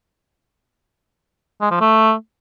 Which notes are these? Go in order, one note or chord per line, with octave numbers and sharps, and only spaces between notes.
G#3
F3
A3